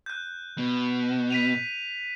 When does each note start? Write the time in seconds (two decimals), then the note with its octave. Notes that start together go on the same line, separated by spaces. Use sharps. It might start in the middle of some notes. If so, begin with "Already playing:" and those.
0.06 F#6 G6
0.58 B2
1.30 B6 D#7 F7